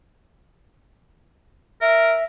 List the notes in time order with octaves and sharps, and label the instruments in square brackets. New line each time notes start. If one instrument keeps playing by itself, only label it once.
[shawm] A#4 [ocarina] E5